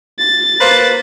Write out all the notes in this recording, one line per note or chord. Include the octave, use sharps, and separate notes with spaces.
A6
A#3 B4 C5